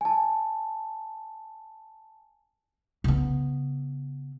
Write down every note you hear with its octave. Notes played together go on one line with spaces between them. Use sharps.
G#5 A5
C#3 B3